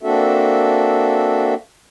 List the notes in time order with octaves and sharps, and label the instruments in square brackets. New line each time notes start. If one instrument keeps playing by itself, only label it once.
[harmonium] A#3 C4 D4 F#4 A4 E5